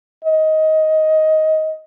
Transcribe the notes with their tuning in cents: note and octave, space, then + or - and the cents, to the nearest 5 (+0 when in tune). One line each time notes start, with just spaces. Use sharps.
D#5 +15